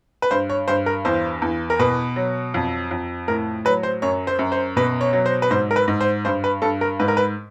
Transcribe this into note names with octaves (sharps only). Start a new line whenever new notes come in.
B4
G2 C5
C#5
G2 C5
A#4
E2 C5
E2
A#4
B2 B4
F#3
F2
F2
A2 A#4
F#3 B4
C5
F#2 C#5
C5
F#2
C5
B2 B4
C#5
F#3
C5
B4
G#2 C5
A#4
B4
G#2
C5
G2 C5
B4
G2 A4
A#4
G#2 B4
A#4
B4